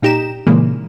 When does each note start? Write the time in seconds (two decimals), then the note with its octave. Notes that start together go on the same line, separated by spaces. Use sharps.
0.02 A#2 D#4 G4 A#5 E7
0.47 A#2 C#3 E3 G#3 A#3